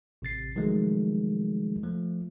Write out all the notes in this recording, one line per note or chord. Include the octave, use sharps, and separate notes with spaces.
A1 C3 A6 C7
C3 D#3 F3 F#3 G#3 A3
F3 A3